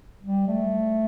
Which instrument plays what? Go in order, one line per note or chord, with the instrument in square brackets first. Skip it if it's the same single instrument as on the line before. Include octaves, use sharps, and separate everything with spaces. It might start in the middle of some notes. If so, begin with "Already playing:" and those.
[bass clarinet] G3
A3